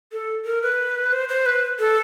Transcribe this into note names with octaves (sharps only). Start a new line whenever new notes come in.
A4
A#4
B4
C5
C5
B4
A4